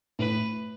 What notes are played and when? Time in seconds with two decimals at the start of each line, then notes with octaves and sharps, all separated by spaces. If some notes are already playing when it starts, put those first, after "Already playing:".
0.19 A2 B4